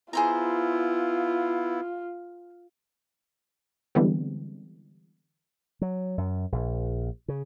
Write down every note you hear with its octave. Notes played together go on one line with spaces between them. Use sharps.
B3 E4 F4 G#4 C5 A#5
D3 E3 G3 G#3 B3 C4
F#3
F#2
A#1
C#3